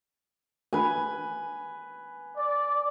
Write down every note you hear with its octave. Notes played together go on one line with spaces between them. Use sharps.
B4 G#5
D5